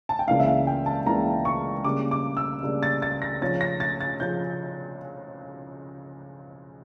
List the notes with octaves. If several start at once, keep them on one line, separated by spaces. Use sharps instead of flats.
A5
G5
C#2 C#3 E3 A#3 D4 F5
E5
F5
G5
A5
C#2 C#3 E3 A#3 D4 A#5
C#6
C#3 G3 A#3 D4 D6
D6
E6
C#3 G3 A#3 D4
A6
A6
A#6
C#3 F3 C#4 A6
A#6
A6
A6
C#3 F3 C#4 G6